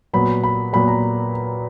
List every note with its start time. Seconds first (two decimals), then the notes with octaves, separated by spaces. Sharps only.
0.13 A#2 F#3 B3 B5
0.44 B5
0.73 A#2 F#3 B3 B5
0.88 A#5